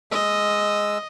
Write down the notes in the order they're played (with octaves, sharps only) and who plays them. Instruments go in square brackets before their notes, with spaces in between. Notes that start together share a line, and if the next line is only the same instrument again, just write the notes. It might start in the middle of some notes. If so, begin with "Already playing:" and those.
[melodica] G#3 E6 [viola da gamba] D#5